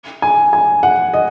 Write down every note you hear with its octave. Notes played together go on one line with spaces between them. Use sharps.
G#5
G#5
F#5
D#5